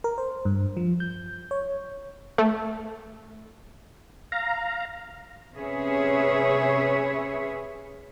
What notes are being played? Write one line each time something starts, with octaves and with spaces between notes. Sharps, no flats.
A#4
C5
G2
F3
G6
C#5
A3
F5 A#5
C3 C#4 G#4 B4 C#5 E5